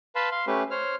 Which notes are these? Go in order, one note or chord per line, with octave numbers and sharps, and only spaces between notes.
B4 F5 A5 B5 C6
F5 C6
A3 C#4 G4 B4
C5 C#5 F6